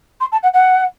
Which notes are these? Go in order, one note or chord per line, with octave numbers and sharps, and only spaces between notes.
C6
A5
F#5
F#5